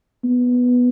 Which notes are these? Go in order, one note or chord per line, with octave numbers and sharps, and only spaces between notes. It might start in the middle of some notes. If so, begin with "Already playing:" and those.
B3